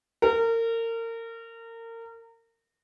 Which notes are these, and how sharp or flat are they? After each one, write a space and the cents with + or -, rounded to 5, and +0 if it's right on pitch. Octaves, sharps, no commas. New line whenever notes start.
A#4 -30